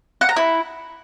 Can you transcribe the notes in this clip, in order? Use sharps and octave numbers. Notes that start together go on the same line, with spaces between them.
F#5
A#5
E4